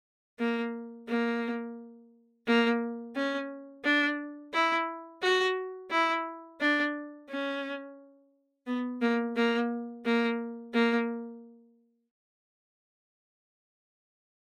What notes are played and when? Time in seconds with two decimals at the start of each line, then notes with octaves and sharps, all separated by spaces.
0.39 A#3
1.08 A#3
2.47 A#3
3.15 C#4
3.84 D4
4.53 E4
5.22 F#4
5.91 E4
6.61 D4
7.30 C#4
8.67 B3
9.01 A#3
9.36 A#3
10.05 A#3
10.74 A#3